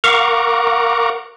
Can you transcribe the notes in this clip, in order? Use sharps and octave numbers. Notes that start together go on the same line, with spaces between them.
A#4 F5 F#5 A#5 C#6 D6